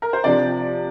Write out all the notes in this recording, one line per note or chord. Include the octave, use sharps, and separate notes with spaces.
A#4
C5
C3 F3 D4 D5